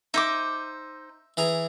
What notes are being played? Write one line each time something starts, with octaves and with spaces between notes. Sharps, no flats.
D#4 C5 E5 D6
E3 G#4 A#5